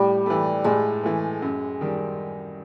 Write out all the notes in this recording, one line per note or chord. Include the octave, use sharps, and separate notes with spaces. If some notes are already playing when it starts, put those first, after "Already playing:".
Already playing: A2 G3
E3 A3
A2 G#3
E3 A3
F#2
D#3 G3